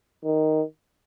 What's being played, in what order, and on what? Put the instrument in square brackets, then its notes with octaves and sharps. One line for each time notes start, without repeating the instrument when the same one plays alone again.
[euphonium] D#3